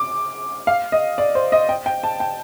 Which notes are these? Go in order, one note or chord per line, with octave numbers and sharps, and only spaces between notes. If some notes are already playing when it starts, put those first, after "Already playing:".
Already playing: D6
F5
D#5
D5
C5
D#5
G5
G5
A5
G5